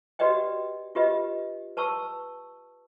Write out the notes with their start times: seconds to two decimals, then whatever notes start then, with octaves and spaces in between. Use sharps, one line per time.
0.19 F#4 G4 B4 D5 D#5 G5
0.95 F4 G4 B4 D#5
1.77 B4 A5 C#6 E6